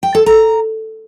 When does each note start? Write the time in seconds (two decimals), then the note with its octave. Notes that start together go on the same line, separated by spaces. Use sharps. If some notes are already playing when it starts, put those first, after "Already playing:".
0.03 G5
0.15 A4
0.26 A#5